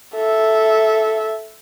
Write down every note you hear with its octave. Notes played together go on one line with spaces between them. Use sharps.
A4 E5